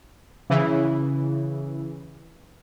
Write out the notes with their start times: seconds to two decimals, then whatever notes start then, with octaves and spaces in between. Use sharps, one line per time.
0.50 C#3 E3